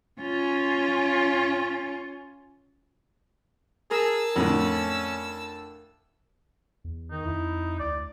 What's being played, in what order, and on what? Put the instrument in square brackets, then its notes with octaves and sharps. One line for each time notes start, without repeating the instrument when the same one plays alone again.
[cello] C#4 F4
[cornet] G#4 [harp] A#4 [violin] A5 E6
[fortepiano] F2 A2 D3 [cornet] C#4
[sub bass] E2
[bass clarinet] D#3 [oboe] D#4
[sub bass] F2 [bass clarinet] E4
[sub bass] D2 [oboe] D5